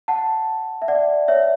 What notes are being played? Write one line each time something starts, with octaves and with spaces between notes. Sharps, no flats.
F#5 A5
E5
D5 F#5
C#5 E5